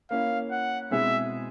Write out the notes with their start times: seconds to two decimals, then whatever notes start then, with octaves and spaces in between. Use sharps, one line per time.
0.11 A#3 C#4 E4 F5
0.51 F#5
0.91 B2 G#3 C4 E4 G#4 E5